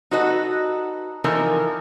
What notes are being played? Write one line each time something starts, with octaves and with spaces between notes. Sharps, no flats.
D#4 F#4 A4 B4 D#5
E3 F3 D#4 A4 A#4